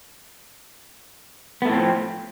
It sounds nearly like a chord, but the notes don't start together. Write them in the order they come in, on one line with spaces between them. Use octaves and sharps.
B3 A3 A2 C4 F3